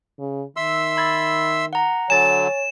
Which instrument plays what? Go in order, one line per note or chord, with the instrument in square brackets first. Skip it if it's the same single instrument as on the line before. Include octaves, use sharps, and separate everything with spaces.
[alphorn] C#3
[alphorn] D#3 [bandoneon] E5 C6 E6
[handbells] B5 G#6 A6
F#5 A#5
[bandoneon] D3 F#3 [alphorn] C#5 [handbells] G#5 A6 [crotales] E7